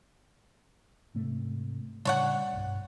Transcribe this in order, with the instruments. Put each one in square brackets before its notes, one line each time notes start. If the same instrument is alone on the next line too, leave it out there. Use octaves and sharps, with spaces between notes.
[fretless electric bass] G#2 C3 A3
[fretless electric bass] A2 C#3 G3 [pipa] D4 C#5 F#5
[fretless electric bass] B1 G2